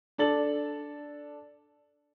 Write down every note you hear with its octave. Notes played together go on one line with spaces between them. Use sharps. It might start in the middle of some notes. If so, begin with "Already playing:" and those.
D4 A4 A6 F#7